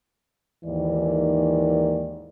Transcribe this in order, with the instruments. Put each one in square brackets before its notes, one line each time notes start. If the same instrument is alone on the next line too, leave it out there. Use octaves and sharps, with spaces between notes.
[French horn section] D#2 G#2 D#3 E3 D5